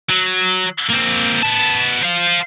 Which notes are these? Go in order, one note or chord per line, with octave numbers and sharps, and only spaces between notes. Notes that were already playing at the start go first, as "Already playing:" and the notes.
F#3
A#3 C4
B3 A5
C5 F5